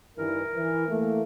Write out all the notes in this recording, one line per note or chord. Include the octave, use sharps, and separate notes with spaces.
G2 D#3 E3 A#4
E3
E3 A3 A#3